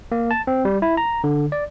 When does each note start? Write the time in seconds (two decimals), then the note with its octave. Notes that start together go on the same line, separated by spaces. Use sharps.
0.12 A#3
0.31 A5
0.47 C4
0.65 G3
0.82 E4
0.97 A#5
1.24 D3
1.52 D5